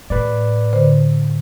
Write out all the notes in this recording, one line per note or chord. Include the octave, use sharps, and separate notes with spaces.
A2 B4 D5
D3 C5